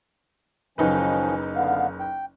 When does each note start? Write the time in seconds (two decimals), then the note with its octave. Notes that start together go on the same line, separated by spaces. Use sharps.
0.78 F#1 D#3 F3 C#4 D#4 B4
1.55 D3 B3 F5
2.00 G5